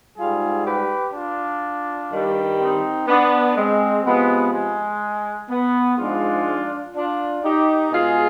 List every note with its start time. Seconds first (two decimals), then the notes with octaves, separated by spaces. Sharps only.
0.17 G#2 G3 F4 G#4
0.66 G4 B4
1.14 D4 F4
2.12 G2 D#3 G3
2.60 C4 D#4
3.08 B3 D4
3.56 G#3 C4
4.05 C3 F3 G#3 B3
4.53 G#3
5.50 B3
5.98 G#2 F3 G#3 D4 F4
6.95 D4 F4
7.44 D#4 G4
7.91 B2 G#3 F4 G#4